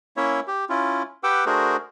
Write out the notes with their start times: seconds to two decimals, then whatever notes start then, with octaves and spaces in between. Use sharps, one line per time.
0.17 A#3 C#4 E4 C#5 E5
0.48 G4
0.69 C#4 E4 F4
1.24 G4 B4 F#5 G5 D6 E6
1.46 A3 D4 F#4 G#4 A#4 C5